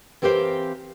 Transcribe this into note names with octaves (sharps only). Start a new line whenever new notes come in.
E3 C4 G4 A#4 C5 F5